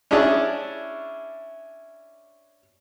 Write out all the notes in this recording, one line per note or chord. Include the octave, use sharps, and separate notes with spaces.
C#4 D4 E4 G#4 C#5 D5